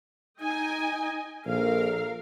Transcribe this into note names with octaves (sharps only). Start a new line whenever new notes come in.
D#4 D#5 G5 G#5
A#1 A4 A#4 F5